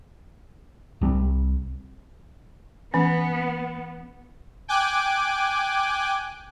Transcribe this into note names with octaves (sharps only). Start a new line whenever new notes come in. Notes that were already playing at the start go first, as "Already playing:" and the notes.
C2 G3 C4
E3 B3 C#4
G5 G#5 D6 F#6